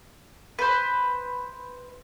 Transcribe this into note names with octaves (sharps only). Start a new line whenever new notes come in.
B4 C5